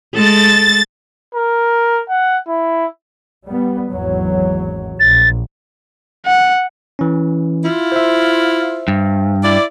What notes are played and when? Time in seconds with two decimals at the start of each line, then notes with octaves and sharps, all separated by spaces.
0.14 G#3 A4 A6
1.35 A#4
2.09 F#5
2.48 E4
3.46 G3 B3
3.91 G#1 E2 F#3
5.00 A#1 A6
6.26 F#5
6.99 E3 C#4
7.65 E4 F4
7.92 C5 E5
8.88 G2
9.43 E4 D5